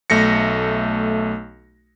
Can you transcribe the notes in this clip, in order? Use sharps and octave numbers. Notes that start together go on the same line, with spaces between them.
B1 A3 A#6 C#7